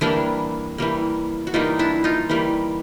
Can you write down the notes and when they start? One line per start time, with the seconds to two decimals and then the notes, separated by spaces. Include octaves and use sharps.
0.01 E3 G3 A#3 D4 E4
0.78 E3 G3 A#3
1.47 F#4
1.54 E3 G3 A#3 D#4 F4
1.79 D4 E4
2.04 D#4 F4
2.30 E3 G3 A#3